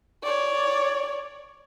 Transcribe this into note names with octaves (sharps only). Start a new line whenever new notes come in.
C#5 D5